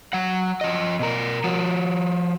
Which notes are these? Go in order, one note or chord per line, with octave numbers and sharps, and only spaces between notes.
F#3 F#5
F3 D#5
B2 A#4
F3 F#4